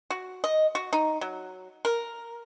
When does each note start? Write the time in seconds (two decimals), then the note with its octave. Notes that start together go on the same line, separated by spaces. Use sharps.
0.10 F#4
0.44 D#5
0.75 F#4
0.93 D#4
1.21 F#3
1.85 A#4